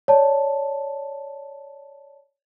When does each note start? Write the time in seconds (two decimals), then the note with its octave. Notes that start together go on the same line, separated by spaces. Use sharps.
0.08 C#5 D5 A5